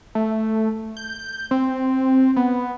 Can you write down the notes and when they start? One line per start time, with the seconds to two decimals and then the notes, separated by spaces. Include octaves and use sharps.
0.15 A3
0.97 G6
1.51 C4
2.36 B3